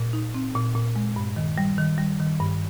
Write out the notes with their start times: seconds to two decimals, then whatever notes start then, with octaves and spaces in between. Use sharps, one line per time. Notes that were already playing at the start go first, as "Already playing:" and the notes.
Already playing: A#2
0.13 D#4
0.34 C4
0.55 A#2
0.75 A#2
0.96 G#3
1.16 G2
1.36 D#3
1.58 G3
1.78 D#3
1.98 G3
2.20 D#3
2.40 G2